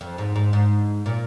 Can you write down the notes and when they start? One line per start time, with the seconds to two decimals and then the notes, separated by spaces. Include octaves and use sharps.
0.01 F2
0.18 G#2
0.36 G#2
0.53 G#2
1.06 A#2